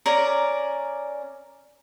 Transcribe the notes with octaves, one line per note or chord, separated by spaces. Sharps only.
C#4 A#4 D5